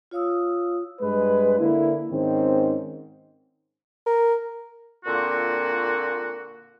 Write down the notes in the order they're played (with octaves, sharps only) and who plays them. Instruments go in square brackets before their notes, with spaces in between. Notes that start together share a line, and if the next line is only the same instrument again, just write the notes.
[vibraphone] F4 C#5 F5 D#6 E6
[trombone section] G2 G#3 B4
D3 A#3 E4
G#2 D#3 C4 C#4
[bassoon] A#4
[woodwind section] A#2 D3 A#3 C4 F4 F#4